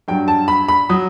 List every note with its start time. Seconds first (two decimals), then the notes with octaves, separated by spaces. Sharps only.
0.08 G2 F#3 G5
0.28 A5
0.48 B5
0.68 B5
0.89 F#3 D#6